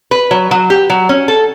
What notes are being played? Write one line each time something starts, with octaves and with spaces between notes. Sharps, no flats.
B4
F#3
F#3
G4
F#3
C#4
A4